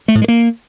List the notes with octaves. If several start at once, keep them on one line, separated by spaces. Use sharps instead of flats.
A3
A2
G#3
A#3